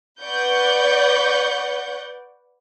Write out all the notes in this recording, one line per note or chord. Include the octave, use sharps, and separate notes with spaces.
B4 D5 F#5 C#6 G6